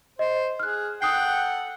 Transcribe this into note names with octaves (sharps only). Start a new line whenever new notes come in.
C5 D#5
G#4 F6 F#6
A4 F#5 G5 D#6 F#6 C7